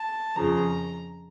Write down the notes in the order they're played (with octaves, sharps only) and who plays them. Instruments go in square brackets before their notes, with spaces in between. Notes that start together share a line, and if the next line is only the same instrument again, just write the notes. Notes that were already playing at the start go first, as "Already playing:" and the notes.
Already playing: [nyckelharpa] A5
[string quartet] F2 C#3 F3 [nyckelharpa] A#5